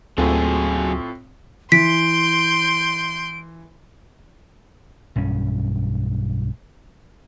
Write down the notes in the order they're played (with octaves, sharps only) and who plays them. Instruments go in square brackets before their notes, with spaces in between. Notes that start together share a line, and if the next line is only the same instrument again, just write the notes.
[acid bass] D2 [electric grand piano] A2 F4 A4 [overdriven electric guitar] F#3 G#4 [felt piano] C4
[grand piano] E3 [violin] C6 G6 [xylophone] B6 [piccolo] D7
[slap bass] B1 G2 C#4